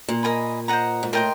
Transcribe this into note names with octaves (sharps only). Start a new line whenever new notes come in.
A#2
A#4 D#5 G#5 B5
C5 D#5 F#5 A#5
G#2
A2 A#4 D#5 G5 C6